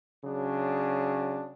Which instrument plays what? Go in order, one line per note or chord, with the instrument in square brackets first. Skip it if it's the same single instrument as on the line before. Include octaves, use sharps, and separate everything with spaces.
[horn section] C#3 F#3 D4